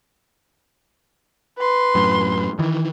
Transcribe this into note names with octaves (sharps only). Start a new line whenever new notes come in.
B4 C6
F#2 A2
D#3 E3